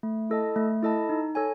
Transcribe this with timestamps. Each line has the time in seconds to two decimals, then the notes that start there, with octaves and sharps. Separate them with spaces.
0.03 A3
0.30 E4 A4 D#5 A5
0.56 A3
0.83 E4 A4 D#5 A5
1.09 D#4
1.35 A4 C#5 G#5